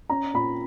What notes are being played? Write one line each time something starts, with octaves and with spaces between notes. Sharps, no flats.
C#4 A#5
A#2 B5